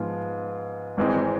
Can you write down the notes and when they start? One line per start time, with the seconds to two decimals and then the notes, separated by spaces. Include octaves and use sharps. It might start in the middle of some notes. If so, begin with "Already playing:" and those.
Already playing: G#2 F3 B3 F4
0.97 G#1 G#2 E3 G#3 C4